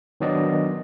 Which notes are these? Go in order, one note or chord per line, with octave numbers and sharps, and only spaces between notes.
D#3 F#3 B3 D4 D5 D#5